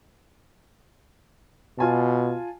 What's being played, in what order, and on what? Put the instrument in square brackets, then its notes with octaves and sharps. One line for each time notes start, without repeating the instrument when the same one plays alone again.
[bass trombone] B2 [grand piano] F4 G#5 A5